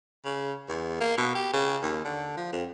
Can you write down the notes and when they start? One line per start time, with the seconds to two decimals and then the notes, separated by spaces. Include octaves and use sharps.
0.25 C#3
0.68 E2
1.00 A#3
1.17 B2
1.35 G4
1.53 C#3
1.83 D#2
2.05 D3
2.37 F3
2.52 F2